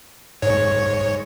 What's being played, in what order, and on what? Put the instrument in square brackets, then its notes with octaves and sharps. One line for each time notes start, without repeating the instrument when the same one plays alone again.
[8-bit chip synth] G#2 C#5